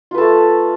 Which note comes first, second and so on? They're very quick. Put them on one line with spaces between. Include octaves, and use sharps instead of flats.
F4 B4 A4 A3